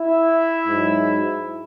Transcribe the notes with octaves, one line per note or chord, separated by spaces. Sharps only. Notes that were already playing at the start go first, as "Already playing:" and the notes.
Already playing: E4 E5
G#2 F#3